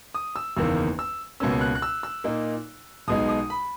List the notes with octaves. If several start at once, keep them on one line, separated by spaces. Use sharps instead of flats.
D#6
E6
F#1 E2 D#3 A#3 E6
E6
C#2 B2 A#3 C#4 E6
F#6
F#6
E6
E6
A#2 A#3 D#4
B1 B2 G#3 D#4 D#6
D#6
B5